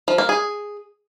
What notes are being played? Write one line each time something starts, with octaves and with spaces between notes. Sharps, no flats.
F3
A#3
G#4